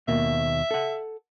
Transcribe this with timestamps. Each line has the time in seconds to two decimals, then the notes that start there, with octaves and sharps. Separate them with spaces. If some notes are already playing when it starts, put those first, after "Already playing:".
0.08 D#2 B2 A#3 E5
0.71 A4 F#5